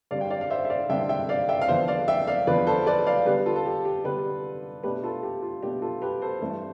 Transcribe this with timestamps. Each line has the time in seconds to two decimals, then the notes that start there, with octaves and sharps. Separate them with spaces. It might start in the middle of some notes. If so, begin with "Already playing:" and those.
0.11 G2 D3 G3 C4 D5 F5
0.21 G5
0.30 D5 F5
0.41 F5
0.50 C5 E5
0.65 E5
0.70 D5 F5
0.90 G2 D3 G3 C4 E5 G5
1.09 E5 G5
1.29 D5 F5
1.49 E5 G5
1.62 F5
1.68 E2 D3 F3 B3 C5 E5
1.88 D5 F5
2.08 E5 G5
2.28 D5 F5
2.47 E2 D3 F3 B3 B4 D5
2.67 A4 C5
2.86 B4 D5
3.07 D5 F5
3.26 D3 G3 B3 D4 G4 B4
3.46 F4 A4
3.56 A4
3.65 G4
3.85 G4
4.04 D3 G3 B3 D4 G4 B4
4.83 B2 A3 D4 G4 B4
5.03 F4 A4
5.23 G4
5.42 F4
5.62 B2 A3 D4 G4
5.82 F4 A4
6.02 G4 B4
6.22 A4 C5
6.41 G2 E3 A3 C4